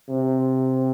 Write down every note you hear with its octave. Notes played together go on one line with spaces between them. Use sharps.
C3